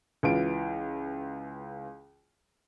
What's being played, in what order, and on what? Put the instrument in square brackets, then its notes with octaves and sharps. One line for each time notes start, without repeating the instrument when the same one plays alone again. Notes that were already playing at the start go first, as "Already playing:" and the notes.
[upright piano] C#2 E3 F4 D7